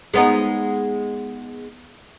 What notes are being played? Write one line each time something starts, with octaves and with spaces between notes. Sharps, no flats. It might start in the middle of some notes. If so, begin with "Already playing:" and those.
G#3 B3 D#4